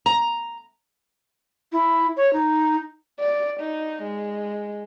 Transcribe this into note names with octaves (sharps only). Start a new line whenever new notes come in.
A#5
E4
C#5
D#4
D5
D#4
G#3